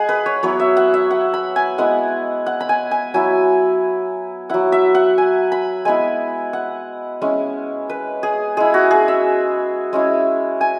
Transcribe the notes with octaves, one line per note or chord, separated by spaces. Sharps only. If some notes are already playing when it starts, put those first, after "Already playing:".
Already playing: G#3 E4 G#4 F#5
B4
C#5
F#3 B3 E4 C#5
E5
F#5
E5
F#5
B5
G#5
G#3 B3 E4 F#5
F#5
B5
G#5
G#5
F#3 E4 G#5
F#3 E4 F#5
E5
F#5
G#5
B5
G#3 B3 E4 G#5
F#5
G#3 C#4 E4
B4
G#4
G#3 E4 G#4
F#4
G#4
E5
G#3 C#4 E4
G#5